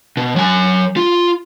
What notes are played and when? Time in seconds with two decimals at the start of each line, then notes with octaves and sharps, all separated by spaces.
0.17 B2
0.36 F#3 G#5
0.96 F4